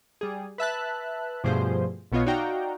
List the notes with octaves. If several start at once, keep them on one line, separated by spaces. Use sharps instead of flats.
G3 G#4
B4 E5 A5 F#6
G2 B2 F3 A3 G#4 C5
B1 B2 B3 F4 C#5 D#5
D#4 F#4 D5 F5 G5 A#5